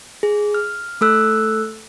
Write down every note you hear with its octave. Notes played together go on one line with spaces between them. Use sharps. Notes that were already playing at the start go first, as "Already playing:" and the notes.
G#4
F6
A3 A4 E6 F#6